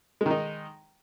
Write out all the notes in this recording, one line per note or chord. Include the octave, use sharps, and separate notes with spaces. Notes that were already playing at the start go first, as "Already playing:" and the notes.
D#3 G#3 D#4